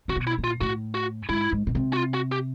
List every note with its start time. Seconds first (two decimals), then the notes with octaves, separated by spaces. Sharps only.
0.08 C3 F#4
0.16 B2
0.27 E4
0.38 A#2
0.44 F4
0.61 A2 F#4
0.95 F#4
1.29 G#2 E4
1.52 G#2
1.67 B2
1.75 C3
1.93 F#4
1.97 F4
2.14 F#4
2.32 G4